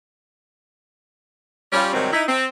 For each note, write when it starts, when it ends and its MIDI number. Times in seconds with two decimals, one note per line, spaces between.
1.73 1.91 55
1.73 1.91 61
1.73 1.91 65
1.93 2.10 44
1.93 2.10 48
1.93 2.10 51
1.93 2.10 54
1.93 2.10 55
1.93 2.10 60
2.13 2.23 63
2.13 2.23 64
2.29 2.45 60